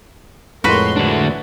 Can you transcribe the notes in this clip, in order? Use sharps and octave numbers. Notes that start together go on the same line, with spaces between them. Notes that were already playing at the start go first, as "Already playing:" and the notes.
F2 A2 G#3 F#4 A#4 B4 C#5 C6
D2 E3 D4